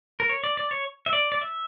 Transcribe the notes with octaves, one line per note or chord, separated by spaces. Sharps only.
A#4
C#5
D5
D5
C#5
E5
D5
D5
E5